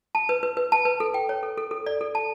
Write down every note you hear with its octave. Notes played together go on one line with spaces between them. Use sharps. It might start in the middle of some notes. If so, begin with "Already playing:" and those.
A5
B4
B4
B4
A5
B4
A4
G5
C#5
A4
A4
A4
D5
A4
A5